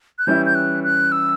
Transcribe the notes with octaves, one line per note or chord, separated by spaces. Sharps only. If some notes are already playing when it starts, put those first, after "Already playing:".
F#6
E3 G3 C#4 E4 G6
G6
F#6
F#6
E6